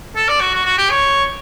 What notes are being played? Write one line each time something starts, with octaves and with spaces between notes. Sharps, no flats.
A4
D5
F#4
F#4
F#4
G4
C#5